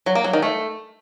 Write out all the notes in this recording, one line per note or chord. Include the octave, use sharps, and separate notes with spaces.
F#3
A#3
F#3
D#3
A3